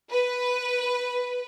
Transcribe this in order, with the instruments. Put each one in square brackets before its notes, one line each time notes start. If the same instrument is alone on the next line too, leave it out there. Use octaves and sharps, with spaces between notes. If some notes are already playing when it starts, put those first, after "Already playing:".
[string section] B4